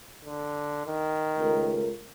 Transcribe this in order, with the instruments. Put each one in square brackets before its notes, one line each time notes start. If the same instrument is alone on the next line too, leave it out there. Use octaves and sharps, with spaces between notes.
[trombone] D3
D#3
[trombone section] C#2 A3 A#4